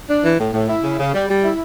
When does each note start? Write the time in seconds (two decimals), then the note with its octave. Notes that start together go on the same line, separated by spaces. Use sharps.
0.09 D4
0.24 E3
0.39 A2
0.54 A2
0.69 E4
0.83 C#3
0.99 C#3
1.14 G3
1.29 G3
1.43 E4